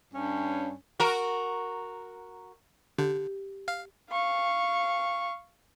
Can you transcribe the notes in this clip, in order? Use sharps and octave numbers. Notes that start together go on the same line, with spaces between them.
G2 C#4
F#4 A#4
D3 G4
F5
F5 C#6